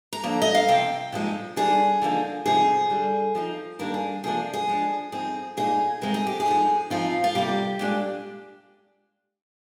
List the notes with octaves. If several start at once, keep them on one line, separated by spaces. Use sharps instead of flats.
A#5
D3 F3 A#3
D#5
F5
C3 F3 C4 G5
A#2 F3 G#3 D#4
D#3 G3 D4 G#4
D3 F3 A#3 D#4
C3 F3 C4 D#4 G#4
D3 G3 C4
F3 C4 D#4
D#3 G3 A#3 D4 A#4
G#4
C3 F3 A#3 D4 G#4
G#4
F3 G#3 D4
F3 C4 D#4 G#4
A#2 G#3 D#4 G#4
C3 D#3 G#3 C4 D#4 A#4
G#4
G4
G#4
F3 G#3 D#4
F3 C4 D#4 F4
F4
C3 G3 A#3 G4
A#2 G#3 D4